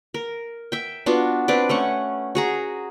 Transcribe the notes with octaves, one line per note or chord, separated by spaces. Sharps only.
A#4
E5 G5
B3 D4 F4 F#4
C4 D4 B4 D5
A3 C#4 F#5
F#4 G#4 A#5